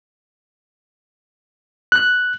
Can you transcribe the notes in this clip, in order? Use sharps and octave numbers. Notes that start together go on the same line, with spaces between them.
F#6